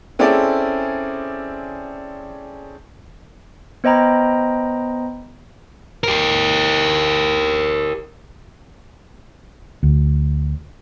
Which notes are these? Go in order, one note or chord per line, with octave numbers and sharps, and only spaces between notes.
C4 C#4 E4 G#4 A4 D5
B3 C5 D#5 G5 A#5 B5
G4 A#4
D2